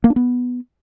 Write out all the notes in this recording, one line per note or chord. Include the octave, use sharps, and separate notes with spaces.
A#3
D4
B3